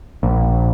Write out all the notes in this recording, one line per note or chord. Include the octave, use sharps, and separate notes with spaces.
A#1